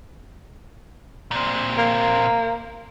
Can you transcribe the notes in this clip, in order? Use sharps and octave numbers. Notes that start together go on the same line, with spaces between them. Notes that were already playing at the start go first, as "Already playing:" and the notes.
A#2 C4
A#3